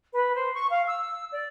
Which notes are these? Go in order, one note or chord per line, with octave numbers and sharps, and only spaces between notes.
B4
C5
C#6
F5
E6
D5